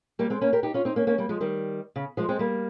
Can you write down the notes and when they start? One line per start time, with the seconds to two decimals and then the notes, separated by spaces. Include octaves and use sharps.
0.19 G3 A#3
0.30 G#3 C4
0.41 A#3 C#4
0.53 G4 A#4
0.63 D#4 G4
0.74 C#4 F4
0.85 C4 D#4
0.96 A#3 C#4
1.07 A#3 C#4
1.18 G3 A#3
1.29 F3 G#3
1.41 D#3 G3
1.96 C#3
2.17 F3 G#3
2.29 G#3 C4
2.39 G3 A#3